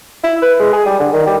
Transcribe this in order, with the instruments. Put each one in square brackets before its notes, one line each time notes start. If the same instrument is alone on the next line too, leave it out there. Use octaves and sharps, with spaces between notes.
[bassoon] E4
B4
G#3
G#4
G3
D3
D#3
G3